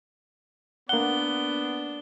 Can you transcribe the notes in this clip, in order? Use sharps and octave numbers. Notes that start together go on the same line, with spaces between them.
A#3 B3 D4 F#5 G7